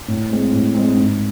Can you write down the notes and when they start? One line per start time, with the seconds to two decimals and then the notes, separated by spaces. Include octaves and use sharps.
0.08 A2
0.30 G#3 C4
0.53 A2
0.75 G#3 C4
0.96 G#2